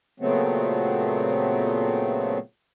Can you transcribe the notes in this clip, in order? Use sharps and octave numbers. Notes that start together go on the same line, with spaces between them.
A#2 C#3 F#3 A3 B3 C4